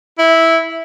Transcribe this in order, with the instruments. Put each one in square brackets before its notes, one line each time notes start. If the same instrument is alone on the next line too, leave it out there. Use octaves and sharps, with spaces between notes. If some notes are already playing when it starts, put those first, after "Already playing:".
[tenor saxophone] E4